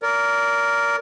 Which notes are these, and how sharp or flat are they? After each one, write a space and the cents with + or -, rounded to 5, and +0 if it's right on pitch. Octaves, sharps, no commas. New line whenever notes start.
A#4 +0 D5 -30